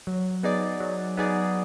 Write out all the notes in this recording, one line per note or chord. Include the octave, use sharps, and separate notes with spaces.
F#3
B3 D#4 G#4 D5
F#3
B3 D#4 G#4 D5